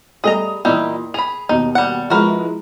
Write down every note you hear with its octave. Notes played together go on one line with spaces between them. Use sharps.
G3 A3 G#4 D#5 A#5 D#6
A#2 E3 G3 D#4 E4
G#4 B5 F7
D#2 B2 D#4
G3 F#5
F3 G#3 E4 F#4 A#4 B4